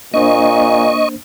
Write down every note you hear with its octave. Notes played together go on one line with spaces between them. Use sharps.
A#2 A#3 D4 C5 D#5 C#6